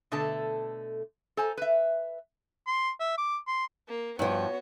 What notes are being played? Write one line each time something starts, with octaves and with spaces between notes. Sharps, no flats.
B2 D3 A3 A4 A5
A4 C5 G#5 A#5
B4 E5
C6
E5
D6
C6
A#3
G2 F3 B3 F#4 C#5